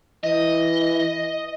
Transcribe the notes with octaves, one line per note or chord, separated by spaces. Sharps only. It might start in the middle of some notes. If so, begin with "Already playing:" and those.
E3 D#5